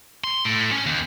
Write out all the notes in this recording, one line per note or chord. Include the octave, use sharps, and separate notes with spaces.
C6
A2
C#4
D#2